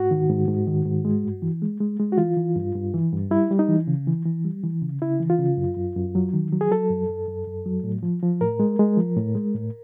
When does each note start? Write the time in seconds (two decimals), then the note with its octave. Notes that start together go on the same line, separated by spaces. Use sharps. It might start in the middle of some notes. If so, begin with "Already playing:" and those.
Already playing: G#2 F#4
0.11 D#3
0.29 G#2
0.48 G#2
0.67 D#3
0.85 G#2
1.05 G#3
1.24 G2
1.42 E3
1.62 G#3
1.81 G#3
2.00 G#3
2.12 F#4
2.18 E3 F4
2.37 E3
2.56 G2
2.75 G2
2.94 E3
3.13 G2
3.31 G3 E4
3.51 G3
3.59 D#4
3.69 E3
3.87 C#3
4.07 E3
4.25 E3
4.45 G3
4.64 E3
4.82 C#3
5.02 C#3 E4
5.20 E3
5.30 F4
5.39 C#3
5.57 F#2
5.77 F#2
5.96 F#2
6.15 F#3
6.34 D#3
6.52 F#3
6.61 G#4
6.71 F#3 A4
6.90 F#2
7.09 F#2
7.28 F#2
7.47 F#2
7.66 F#3
7.84 A2
8.03 F3
8.23 F3
8.41 A2 A#4
8.60 G#3
8.79 G#3
8.97 F3
9.16 A2
9.35 G#3
9.54 A2